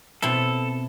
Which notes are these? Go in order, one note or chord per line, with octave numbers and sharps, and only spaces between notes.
B2 C4 E4 A4